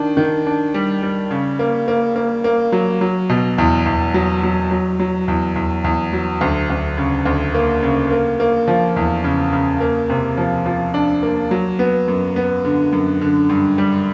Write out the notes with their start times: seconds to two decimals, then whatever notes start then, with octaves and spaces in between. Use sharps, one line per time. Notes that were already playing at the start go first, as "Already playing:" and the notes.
Already playing: D#3 D4
0.17 D#3
0.46 D4
0.74 G3
1.03 G3
1.31 C#3
1.59 A#3
1.88 A#3
2.16 A#3
2.44 A#3
2.72 F#3
3.01 F#3
3.29 B2
3.58 E2
3.86 E2
4.14 F#3
4.43 F#3
4.71 F#3
4.99 F#3
5.28 E2
5.56 E2
5.84 E2
6.13 F#3
6.41 D2
6.70 D2
6.98 C#3
7.25 D2
7.54 A#3
7.83 C#3
8.11 A#3
8.40 A#3
8.68 F3
8.96 E2
9.24 C#3
9.53 C#3
9.81 A#3
10.10 C3
10.37 F3
10.66 F3
10.94 D4
11.23 A#3
11.51 F#3
11.79 B3
12.08 F#2
12.36 B3
12.65 D3
12.93 F#2
13.21 D3
13.49 G2
13.78 G3